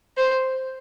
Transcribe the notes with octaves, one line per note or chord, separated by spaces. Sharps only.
C5